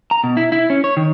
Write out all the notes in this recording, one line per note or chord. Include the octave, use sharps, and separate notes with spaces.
A#5
B2
E4
E4
C#4
C#5
D#3